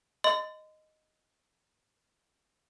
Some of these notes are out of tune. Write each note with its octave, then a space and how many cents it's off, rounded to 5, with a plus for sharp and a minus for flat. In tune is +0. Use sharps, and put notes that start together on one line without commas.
D#5 +0 C6 -35